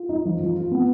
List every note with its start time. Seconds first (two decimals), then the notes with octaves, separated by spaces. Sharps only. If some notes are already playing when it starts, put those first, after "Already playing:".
Already playing: F4
0.09 D#4
0.25 F3
0.41 F3
0.56 F4
0.71 B3